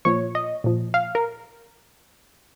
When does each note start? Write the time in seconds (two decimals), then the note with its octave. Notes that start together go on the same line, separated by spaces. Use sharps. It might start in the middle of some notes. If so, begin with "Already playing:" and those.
0.05 A#2 F3 C#5
0.35 D#5
0.64 A#2 F3
0.94 F5
1.15 A#4